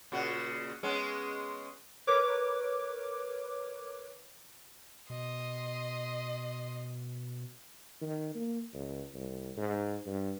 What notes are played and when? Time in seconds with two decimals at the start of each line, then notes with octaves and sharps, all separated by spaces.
0.12 A#2 C#3 F#4
0.83 G#3 B3 C#4
2.07 A#4 B4 C#5 D6
5.10 B2 D#5 C6
8.01 D#3
8.35 A#3
8.74 C#2
9.14 C2
9.57 G#2
10.06 G2